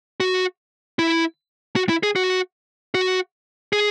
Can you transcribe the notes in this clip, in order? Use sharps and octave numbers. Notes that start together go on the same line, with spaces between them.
F#4
E4
F#4
E4
G#4
F#4
F#4
G#4